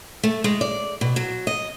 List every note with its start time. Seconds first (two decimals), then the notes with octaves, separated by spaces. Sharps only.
0.23 A3
0.44 G#3
0.61 D5
1.01 B2
1.16 F#3
1.47 D#5